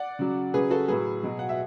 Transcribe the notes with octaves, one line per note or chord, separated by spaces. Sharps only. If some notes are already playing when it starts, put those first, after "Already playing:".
Already playing: D5 F#5
C#3 F#3
C#3 F#3 G#4 B4
F#4 A4
A2 F#3 G#4 B4
B2 F#3
F#5
E5